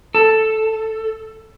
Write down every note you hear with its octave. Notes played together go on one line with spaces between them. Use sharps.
A4